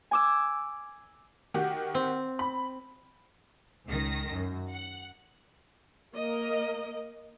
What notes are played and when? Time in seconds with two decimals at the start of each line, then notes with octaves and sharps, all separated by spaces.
0.11 G#5 D6 E6
1.54 D#3 F#4 G4
1.95 C4
2.39 B5
3.87 C#2 D#3 A#6
4.32 F#2
4.70 F#5
6.15 A#3 A#4 D#5